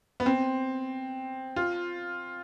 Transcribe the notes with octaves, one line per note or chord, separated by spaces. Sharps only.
B3
C4
F4